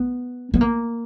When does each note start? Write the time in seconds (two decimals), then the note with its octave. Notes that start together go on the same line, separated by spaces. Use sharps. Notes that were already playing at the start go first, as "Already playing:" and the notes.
Already playing: B3
0.54 B3
0.61 A#3